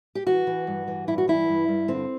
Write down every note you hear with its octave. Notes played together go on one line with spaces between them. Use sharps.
G4
E3 F#4
E3
G2
E3
G2 E4
F#4
E3 E4
G2
G2
D3 C4